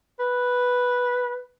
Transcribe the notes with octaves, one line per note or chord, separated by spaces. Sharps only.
B4